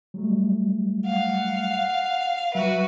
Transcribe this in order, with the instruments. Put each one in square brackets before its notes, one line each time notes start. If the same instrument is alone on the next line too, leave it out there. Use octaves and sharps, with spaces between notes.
[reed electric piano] F#3 G3 A3
[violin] F5 [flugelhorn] F#5
[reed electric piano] F#3 E5 [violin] F#4 B4